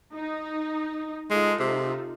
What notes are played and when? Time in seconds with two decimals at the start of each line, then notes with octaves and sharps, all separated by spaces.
0.13 D#4
1.30 G#3 D#4 F4 A4
1.60 C3